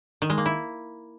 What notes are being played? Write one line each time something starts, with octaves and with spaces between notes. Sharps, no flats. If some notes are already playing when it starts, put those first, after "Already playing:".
D#3
G#3
A#3
E4